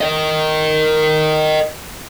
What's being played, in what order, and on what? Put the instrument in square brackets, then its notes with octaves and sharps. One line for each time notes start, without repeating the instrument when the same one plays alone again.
[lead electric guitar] A#4 D#5